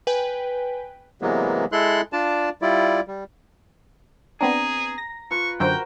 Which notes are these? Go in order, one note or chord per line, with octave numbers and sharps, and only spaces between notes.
B4 G5 G#5
C3 E3 F#3 G#3 A#3 B3
G#3 E4 A4 C6 F#6
D4 F4 D5 A5
G3 E4 F4 D5
G3
B3 C4 D4 G#4 A#5
A#6
F4 B4 C#6
F#2 D3 F#4 A#4 C5 G5